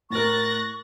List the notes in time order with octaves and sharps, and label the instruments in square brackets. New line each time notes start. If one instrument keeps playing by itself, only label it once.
[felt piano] A2 A#4 [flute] C#6 [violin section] F#6 A6 A#6